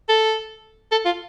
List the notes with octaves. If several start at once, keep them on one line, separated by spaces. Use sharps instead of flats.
A4
A4
F4